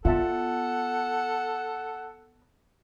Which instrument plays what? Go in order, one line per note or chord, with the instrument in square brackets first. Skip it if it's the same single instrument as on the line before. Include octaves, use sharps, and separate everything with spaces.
[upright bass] B3 [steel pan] F4 E5 A5 [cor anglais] A4 [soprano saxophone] F#5